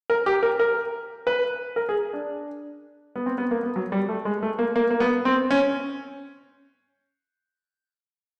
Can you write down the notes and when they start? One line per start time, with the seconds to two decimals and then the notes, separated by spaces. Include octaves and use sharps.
0.10 A#4
0.26 G4
0.43 A#4
0.59 A#4
1.27 B4
1.76 A#4
1.89 G#4
2.13 D4
3.16 B3
3.26 C4
3.38 B3
3.51 A#3
3.63 B3
3.76 F#3
3.92 G3
4.09 A3
4.25 G#3
4.42 A3
4.59 A#3
4.76 A#3
4.90 A#3
5.00 B3
5.25 C4
5.51 C#4